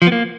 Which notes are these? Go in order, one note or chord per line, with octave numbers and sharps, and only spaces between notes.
F3
B3
A#3